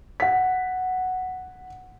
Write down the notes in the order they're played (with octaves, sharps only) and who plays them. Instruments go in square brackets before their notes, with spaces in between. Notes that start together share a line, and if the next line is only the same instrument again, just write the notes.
[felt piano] F#5 B6